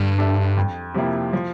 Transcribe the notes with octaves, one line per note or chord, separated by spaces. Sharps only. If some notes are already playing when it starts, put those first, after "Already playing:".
Already playing: G2 D3
G3 D4 A4 E5
F2
C3 F3 A#3 E4
F3